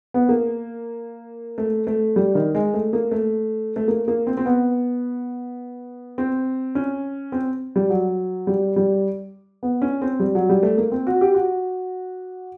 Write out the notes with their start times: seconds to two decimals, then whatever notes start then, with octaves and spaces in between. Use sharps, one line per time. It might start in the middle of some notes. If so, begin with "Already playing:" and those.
0.14 B3
0.29 A#3
1.58 A3
1.87 A3
2.16 G3
2.35 D#3
2.55 G#3
2.74 A3
2.93 A#3
3.11 A3
3.76 A3
3.88 A#3
4.08 A#3
4.27 C4
4.37 C4
4.46 B3
6.18 C4
6.75 C#4
7.32 C4
7.76 G3
7.90 F#3
8.47 G3
8.76 G3
9.63 B3
9.82 C#4
10.02 C4
10.20 G3
10.35 F#3
10.49 G3
10.63 A3
10.78 A#3
10.92 C4
11.07 F#4
11.21 G4
11.34 F#4